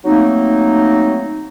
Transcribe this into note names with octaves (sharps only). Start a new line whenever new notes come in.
F#3 A3 A#3 C4 D#4